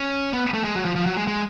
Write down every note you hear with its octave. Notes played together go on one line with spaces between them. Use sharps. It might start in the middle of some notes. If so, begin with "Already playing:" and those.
Already playing: C#4
B3
A3
G#3
F#3
F3
F3
F#3
G#3
G#3